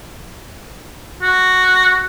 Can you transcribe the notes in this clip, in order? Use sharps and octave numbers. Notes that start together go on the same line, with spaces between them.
F#4